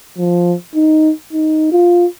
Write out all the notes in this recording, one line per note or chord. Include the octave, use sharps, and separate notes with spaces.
F3
D#4
D#4
F4